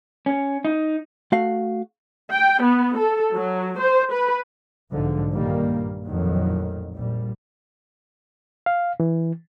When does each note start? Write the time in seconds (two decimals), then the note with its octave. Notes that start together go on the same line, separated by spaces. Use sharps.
0.26 C#4
0.65 D#4
1.32 A3 F#4 F5
2.31 G5
2.61 B3
2.96 A4
3.33 F#3
3.77 C5
4.11 B4
4.91 B1 G#2 D3 F3
5.31 G2 A#2 D#3 G3 A#3
6.05 A#1 F2 A2 D#3 F#3
6.94 A#1 G3
8.66 F5
9.00 E3